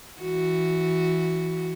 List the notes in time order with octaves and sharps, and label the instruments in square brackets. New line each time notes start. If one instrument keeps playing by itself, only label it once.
[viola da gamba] E3 F#4